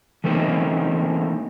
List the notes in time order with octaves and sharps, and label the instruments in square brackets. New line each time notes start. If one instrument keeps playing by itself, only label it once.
[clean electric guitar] E3 A3 A#3 C4 C#4 D#4